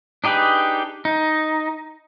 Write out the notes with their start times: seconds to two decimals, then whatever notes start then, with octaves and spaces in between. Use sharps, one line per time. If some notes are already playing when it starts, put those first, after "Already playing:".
0.24 D4 D#4 G4 G#4 B4
1.05 D#4